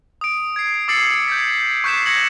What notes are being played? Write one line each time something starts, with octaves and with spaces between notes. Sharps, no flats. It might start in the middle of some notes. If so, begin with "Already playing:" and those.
D#6 D7
G#6 C7
D6 E6 A6 C7 C#7 F#7
G6 G#6 B6
C#6 F#6 G6 B6 C7 E7
G#6 A#6 C#7 F#7